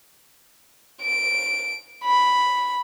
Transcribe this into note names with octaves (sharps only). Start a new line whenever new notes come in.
D7
B5